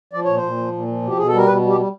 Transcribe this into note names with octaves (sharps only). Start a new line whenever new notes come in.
F3 D5
A#2 C#5
C5
A#2
F3
A#2
F3
B2 G4
B2 G#4
A4
G3 A#4
B2 B4
G3
G4
G3